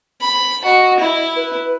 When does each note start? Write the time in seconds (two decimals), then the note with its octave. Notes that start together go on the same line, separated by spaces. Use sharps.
0.21 B5
0.65 F#4 D#5
1.00 E4 D#5
1.36 B4